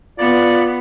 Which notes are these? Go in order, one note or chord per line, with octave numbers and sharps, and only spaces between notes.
B3 F4 D5